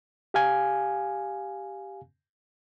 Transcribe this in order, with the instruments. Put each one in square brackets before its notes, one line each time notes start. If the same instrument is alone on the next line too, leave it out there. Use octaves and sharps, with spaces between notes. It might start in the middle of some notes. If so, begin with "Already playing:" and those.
[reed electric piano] G4 F5 G#5